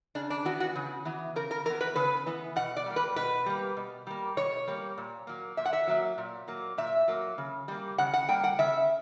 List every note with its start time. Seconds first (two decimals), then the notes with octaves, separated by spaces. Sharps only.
0.15 C#3 D4
0.30 D4
0.45 E3 B3 F#4
0.60 F#4
0.75 C#3
1.05 E3 B3
1.36 C#3 A#4
1.51 A#4
1.65 E3 A#4
1.70 B3
1.81 B4
1.96 C#3 B4
2.26 E3 B3
2.56 B2 F#5
2.76 D5
2.86 G3 A#3
2.96 B4
3.16 B2 B4
3.46 G3 A#3
3.77 B2
4.07 G3 A#3
4.37 B2 C#5
4.68 G3 A#3
4.98 A#2
5.27 F#3 A#3
5.57 A#2 E5
5.65 F#5
5.73 E5
5.87 F#3 A#3
6.18 A#2
6.48 F#3 A#3
6.78 A#2 E5
7.08 F#3 A#3
7.38 C#3
7.68 G3 A#3
7.98 C#3 F#5
8.13 F#5
8.29 G3 A#3 G5
8.44 F#5
8.59 C#3 E5